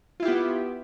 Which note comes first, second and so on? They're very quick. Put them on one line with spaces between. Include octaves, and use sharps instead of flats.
F4 E4 G4 B3